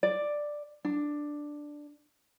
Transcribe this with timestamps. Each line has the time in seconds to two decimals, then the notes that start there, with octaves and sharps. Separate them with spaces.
0.03 D5
0.85 D4